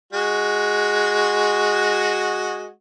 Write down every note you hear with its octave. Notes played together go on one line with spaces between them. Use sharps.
G#3 F#4